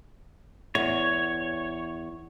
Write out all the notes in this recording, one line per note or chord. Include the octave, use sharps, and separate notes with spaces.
E2 C#5